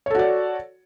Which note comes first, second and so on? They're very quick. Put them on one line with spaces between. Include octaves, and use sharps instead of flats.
C#5 A4 F#4 D5